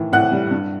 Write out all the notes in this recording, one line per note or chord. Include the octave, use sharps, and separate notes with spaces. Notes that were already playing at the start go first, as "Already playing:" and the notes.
Already playing: A2 D#3 E3
A2 F#5 F#6
G3
G2